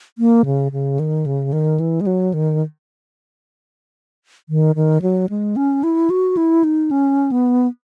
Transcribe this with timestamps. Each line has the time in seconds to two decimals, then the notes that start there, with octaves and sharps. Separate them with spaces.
0.18 A#3
0.45 C#3
0.72 C#3
0.99 D#3
1.26 C#3
1.53 D#3
1.80 E3
2.01 G#3
2.07 F#3
2.34 D#3
4.49 D#3
4.76 D#3
5.02 F#3
5.29 G#3
5.56 C#4
5.83 E4
6.10 F#4
6.37 E4
6.64 D#4
6.91 C#4
7.32 B3